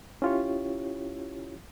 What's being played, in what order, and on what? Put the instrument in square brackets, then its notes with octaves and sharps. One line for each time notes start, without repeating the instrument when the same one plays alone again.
[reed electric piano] C#4 E4 F4 G4 C#5